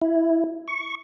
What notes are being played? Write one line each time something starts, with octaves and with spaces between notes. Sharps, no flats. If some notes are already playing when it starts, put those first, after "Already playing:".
E4
C#6